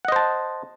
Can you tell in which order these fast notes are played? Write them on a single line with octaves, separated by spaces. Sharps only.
F#5 D#5 C5 A5